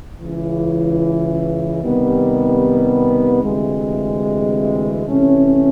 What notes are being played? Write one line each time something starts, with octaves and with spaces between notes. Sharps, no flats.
C#2 C#3 E3
C3 D#3 G3 B3
D2 C3 E3 G#3
C3 E3 A3 C#4